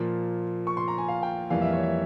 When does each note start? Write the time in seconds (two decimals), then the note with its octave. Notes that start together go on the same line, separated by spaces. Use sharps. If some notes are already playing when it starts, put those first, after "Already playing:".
Already playing: A#2 F3 A#3
0.67 C#6
0.77 C6
0.88 A#5
0.98 G#5
1.08 F5
1.23 G5
1.50 F2 E3 G3 A#3 F5
1.62 E5
1.73 C#5
1.83 E5